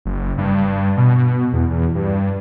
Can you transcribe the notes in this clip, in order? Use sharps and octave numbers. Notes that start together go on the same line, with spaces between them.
F#1
G2
B2
E2
E2
G2